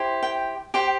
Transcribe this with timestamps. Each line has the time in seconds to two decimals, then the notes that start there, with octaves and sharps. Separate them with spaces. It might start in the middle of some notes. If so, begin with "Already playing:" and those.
Already playing: E4 G4 C5
0.23 G5
0.74 G4 C5 G5